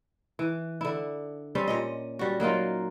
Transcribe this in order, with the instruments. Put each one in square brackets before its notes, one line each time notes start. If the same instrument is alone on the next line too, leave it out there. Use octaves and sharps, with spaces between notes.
[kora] E3
D3 E4
G3 C4 C#4
A#2 C#4 D#5
G3 F#4
F#3 A#3 D#4 F4